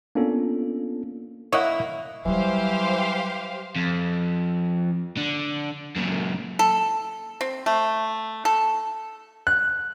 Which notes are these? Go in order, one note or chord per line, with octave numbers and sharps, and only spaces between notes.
A#3 B3 C#4 D4 F4 A4
A#3 E4 C#5 D#5 F#5
E3 F#3 G3 G4 C5 F5
F2
D3
F#2 A#2
A4
C4
A3
A4
F#6